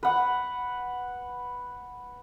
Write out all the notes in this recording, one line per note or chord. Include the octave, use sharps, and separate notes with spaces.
B4 F#5